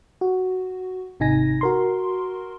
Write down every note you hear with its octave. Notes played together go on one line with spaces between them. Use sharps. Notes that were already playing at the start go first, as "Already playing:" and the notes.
F#4
G#1 C3 D#4 G#5 A#6
F#4 A#4 C6